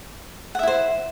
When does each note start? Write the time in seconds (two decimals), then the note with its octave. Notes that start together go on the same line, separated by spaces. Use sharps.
0.55 F#5
0.59 E5
0.63 E4
0.67 C5